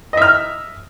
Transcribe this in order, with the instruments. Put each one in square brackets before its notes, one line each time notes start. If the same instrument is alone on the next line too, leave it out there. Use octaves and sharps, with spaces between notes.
[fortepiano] D#5
E5
F6